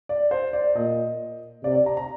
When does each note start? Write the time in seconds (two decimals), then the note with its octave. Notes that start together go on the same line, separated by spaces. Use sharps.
0.09 D5
0.31 C5
0.53 D5
0.76 A#2 D#5
1.64 C3 D5
1.75 D5
1.86 A#5
1.97 A#5